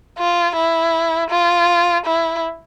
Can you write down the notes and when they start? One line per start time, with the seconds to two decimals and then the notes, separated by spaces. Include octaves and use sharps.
0.18 F4
0.56 E4
1.30 F4
2.05 E4